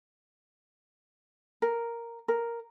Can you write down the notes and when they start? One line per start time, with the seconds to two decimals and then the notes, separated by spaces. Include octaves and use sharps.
1.62 A#4
2.28 A#4